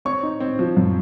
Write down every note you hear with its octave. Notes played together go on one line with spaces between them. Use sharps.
C4 C#5 C#6
D#4
C4
F3
F#2